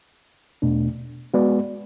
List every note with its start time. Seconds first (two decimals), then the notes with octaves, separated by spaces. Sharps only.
0.62 E2 B2 A3 D4
1.34 G#3 B3 F#4 B4 D5